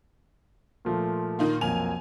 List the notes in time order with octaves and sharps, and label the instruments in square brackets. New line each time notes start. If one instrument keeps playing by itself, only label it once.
[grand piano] A#2 F3 A3
[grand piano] A#2 [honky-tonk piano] D#3 D#4 F4
[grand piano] B1 F2 A#3 [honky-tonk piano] G#5 F7